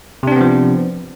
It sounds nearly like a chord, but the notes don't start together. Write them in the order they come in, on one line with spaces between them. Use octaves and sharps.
C3 D4 C4 B3 F3